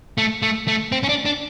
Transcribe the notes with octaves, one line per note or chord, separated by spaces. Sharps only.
A3
A3
A3
C4
C#4
D4
D4